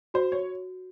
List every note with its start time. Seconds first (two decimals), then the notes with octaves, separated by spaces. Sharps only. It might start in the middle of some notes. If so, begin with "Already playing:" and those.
0.14 F#4 C5
0.32 C#5